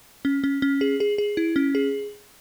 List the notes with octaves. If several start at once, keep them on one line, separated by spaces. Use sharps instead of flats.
C#4
C#4
C#4
G#4
G#4
G#4
E4
C#4
G#4